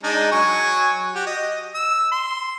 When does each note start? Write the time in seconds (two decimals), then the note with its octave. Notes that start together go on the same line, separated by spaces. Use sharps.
0.03 G#3 D4 D#4
0.32 F#3 G#5 C#6
1.15 F#4 G4
1.26 D#5
1.75 E6
2.12 C6